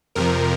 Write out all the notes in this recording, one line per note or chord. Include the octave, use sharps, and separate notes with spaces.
F2 C3 F3 A#4